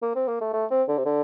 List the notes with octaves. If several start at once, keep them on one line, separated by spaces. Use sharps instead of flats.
A#3
C4
A#3
A3
A3
C4
D3
C3
D3